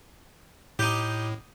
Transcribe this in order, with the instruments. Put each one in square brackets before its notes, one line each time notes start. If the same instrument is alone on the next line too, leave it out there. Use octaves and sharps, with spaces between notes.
[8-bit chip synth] A2 [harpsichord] D#4 G4